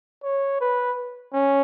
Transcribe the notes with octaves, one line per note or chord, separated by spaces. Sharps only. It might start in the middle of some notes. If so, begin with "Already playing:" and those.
C#5
B4
C#4